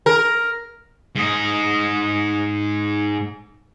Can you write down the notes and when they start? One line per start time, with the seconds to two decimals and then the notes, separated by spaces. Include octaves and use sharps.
0.06 A#4
1.15 G#2 D#5